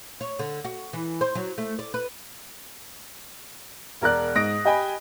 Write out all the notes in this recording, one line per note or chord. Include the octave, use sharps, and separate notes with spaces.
C#5
D3
F#4
E3
C5
F#3
A3
D5
B4
E1 A#4 D5 F#6
G#2 D#6 A#6 D7
G4 D#5 G5 G#5 B5